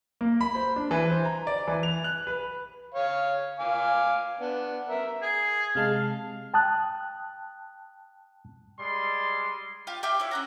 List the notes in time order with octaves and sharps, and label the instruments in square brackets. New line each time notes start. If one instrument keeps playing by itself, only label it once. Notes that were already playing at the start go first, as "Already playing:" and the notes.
[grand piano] A#3
B5
C5
D4
E3
C5
A#5
D5
E3
F7
F#6
B4
[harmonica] C#5 F5
F5 G#5 D6
B3 D4
A#4 E5
[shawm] G#4
[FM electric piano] C3 G#3 A5 [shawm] F5
[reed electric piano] G5 A5 D#6 F#6
[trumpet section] G3 G#3 D5 C6
[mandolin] F4 G4 F5
G4 E5 G5 F6
E4 C#5
C#4 F#5 A#5